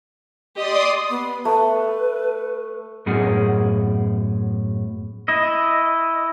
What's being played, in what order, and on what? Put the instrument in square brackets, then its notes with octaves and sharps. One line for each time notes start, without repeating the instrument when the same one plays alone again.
[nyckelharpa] G4 D#5 [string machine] D5 C6 D#6
[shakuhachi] B3
[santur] A3 [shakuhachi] B4
[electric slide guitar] F#2 A2 B3 G#4 F#5
[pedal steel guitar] E4 D#5